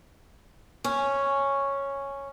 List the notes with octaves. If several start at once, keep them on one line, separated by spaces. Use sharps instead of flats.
C#4